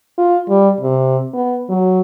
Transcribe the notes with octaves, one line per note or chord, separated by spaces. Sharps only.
F4
G3
C3
B3
F#3